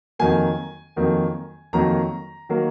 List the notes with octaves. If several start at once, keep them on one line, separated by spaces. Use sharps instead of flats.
F2 D#3 F#3 A#3 G#5
F2 D#3 F#3 A#3
F2 D#3 F#3 A#3 A#5
D#3 F#3 A#3